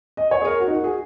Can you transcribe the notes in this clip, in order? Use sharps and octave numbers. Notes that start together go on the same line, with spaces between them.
D#5
C#5
G#4
A#4
F#4
D#4
F#4
G#4